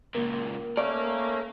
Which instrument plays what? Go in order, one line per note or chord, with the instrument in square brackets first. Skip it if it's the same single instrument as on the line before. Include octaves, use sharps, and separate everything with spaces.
[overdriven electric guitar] C#2 A#2 [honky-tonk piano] A#3
[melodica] A3 C#4 [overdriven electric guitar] A#4 F5 [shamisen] D5